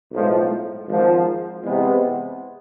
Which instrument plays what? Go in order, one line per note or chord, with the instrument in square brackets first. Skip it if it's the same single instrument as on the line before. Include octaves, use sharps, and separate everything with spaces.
[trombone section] B1 A2 F3 G#3
G#1 G#2 F3
E2 C3 G#3 B3